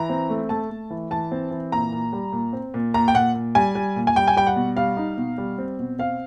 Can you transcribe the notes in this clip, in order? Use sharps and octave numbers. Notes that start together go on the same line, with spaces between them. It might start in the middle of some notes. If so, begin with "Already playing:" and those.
Already playing: E3 A#5
C4
A3
A3 A5
A3
E3
E3 A5
C4
E3
A#2 A#5
A#2
G3
A#2
C4
A#2
A#2 A#5
G5
A#2 F#5
A#2
G3 G#5
G3
A#2
G#5
G3 G5
G#5
G3 G5
F#5
B2
G3 F5
D#4
B2
G3
C4
B2
C4 F5